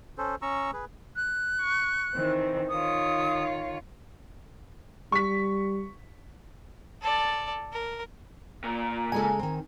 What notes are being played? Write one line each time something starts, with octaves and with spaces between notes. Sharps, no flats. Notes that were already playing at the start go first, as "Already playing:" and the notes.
C#4 A4 C5
C#4 A#5 C#6 E6
G#4 B4
F#6
C#6
D#3 E3 C4
D#3 F4 C#5 D#6
G3 C#6 B6
A4 D5
A#4
A#2 A#5
C#3 G#3 A4 G#5
D#3 C4